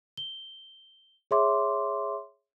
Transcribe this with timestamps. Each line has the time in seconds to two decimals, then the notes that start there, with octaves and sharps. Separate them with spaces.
0.17 G7
1.31 G#4 C#5 E5 C6 D6